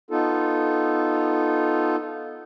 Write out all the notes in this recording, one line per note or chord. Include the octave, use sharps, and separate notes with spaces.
B3 D#4 F4 A4